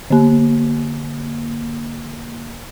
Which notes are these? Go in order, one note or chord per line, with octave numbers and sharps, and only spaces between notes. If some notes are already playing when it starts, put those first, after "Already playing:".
D3 A#3